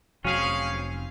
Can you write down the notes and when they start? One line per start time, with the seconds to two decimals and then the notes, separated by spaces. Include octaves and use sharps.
0.25 F1 F#3 C4 C#4 G#4 F5